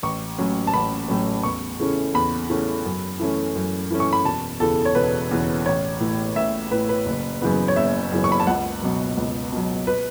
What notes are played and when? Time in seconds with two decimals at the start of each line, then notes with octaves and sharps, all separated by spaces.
0.03 A1 C#6
0.38 A2 F#3 C#4
0.67 A5
0.74 A1 B5
1.08 A2 F#3 C#4
1.43 E2 C#6
1.79 C#3 E3 A3 C#4
2.14 E2 B5
2.49 C#3 E3 A3 C#4
2.85 F#2
3.20 E3 A3 C#4
3.56 F#2
3.91 E3 A3 C#4
4.00 C#6
4.13 B5
4.25 E1 A5
4.60 E2 C#3 E3 A4
4.85 C#5
4.95 E1 B4
5.31 E2 C#3 E3
5.66 A1 C#5
6.00 A2 E3
6.36 A1 E5
6.71 A2 E3 B4
6.89 B4
7.06 F#1
7.42 F#2 C#3 E3 B3
7.68 C#5
7.76 F#1 E5
8.12 F#2 C#3 E3 B3
8.24 C#6
8.32 B5
8.40 A5
8.47 C#2 F#5
8.82 B2 F#3
9.17 C#2
9.52 B2 F#3
9.87 B4